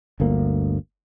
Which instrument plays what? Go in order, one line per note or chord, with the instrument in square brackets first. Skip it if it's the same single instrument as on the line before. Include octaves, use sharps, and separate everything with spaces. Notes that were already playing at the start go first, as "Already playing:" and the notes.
[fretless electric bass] G1 D2 A#3